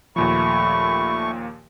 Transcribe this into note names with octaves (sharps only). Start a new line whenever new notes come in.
D#2 A#2 F3 A3 B5 C#6